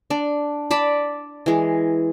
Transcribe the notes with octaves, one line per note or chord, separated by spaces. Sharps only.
D4
D5 A5 B5
E3 G#3